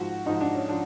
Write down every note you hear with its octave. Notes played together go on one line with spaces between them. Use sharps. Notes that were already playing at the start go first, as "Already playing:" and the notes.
Already playing: G#2 F3 F#4
G#2 F3 D#4
D4
C#4
F3 D4